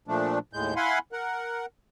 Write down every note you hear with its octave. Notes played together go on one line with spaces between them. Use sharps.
A#2 F3 A3 D4
D#2 A2 G#3 G6
E4 F5 F#5 G#5 B5 C6
A#4 F#5